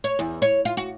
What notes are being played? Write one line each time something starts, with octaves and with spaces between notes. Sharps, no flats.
C#5
E2
C#5
F4
F#4